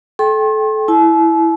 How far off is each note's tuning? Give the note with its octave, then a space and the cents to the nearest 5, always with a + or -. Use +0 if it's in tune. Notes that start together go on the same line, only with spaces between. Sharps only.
A4 -25 G5 +0 C6 +45
E4 +0 A5 -45